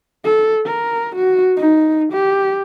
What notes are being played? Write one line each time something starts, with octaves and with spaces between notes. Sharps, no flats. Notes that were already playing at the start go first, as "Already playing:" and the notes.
A4
A#4
F#4
D#4
G4